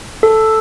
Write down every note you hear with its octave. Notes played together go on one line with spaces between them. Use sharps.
A4